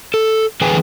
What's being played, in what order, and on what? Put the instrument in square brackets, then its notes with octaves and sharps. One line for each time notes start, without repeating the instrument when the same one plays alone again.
[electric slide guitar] A4
D3 E3 G#4 B4 G5 G#5